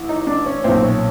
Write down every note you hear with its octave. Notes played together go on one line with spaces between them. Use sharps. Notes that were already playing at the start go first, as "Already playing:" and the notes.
Already playing: A1
D#4
D4
C#4
B1 A#2 C4
C#4